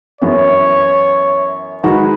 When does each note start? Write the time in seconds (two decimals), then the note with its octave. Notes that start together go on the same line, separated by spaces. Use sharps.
0.21 F#2 E3 B3 C#5
1.83 D#3 G#3 D#4 F#4 B4